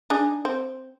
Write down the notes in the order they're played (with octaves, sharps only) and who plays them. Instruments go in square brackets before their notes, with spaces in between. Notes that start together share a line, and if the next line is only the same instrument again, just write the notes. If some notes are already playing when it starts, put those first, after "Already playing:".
[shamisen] D4 D#4 G#4
C4